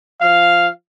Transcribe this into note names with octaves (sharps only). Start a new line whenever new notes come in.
F3 F5